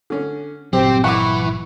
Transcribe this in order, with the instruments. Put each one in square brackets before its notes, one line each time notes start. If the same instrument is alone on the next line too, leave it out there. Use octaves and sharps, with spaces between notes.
[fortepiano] D3 C#4
[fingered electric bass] G1 A#2 F#3 [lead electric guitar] C4 [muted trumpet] G4 [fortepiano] C5
[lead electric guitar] E3 [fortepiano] F#5 B5 D6 [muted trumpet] C#6